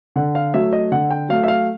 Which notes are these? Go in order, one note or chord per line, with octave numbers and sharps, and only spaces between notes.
D3 F#5
F5
F#3 A3 E5
D#5
D3 F#5
G5
F#3 A3 F5
E5
F5